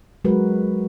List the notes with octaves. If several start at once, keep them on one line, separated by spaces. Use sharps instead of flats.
F#3 G#3 F#4 A#4 B4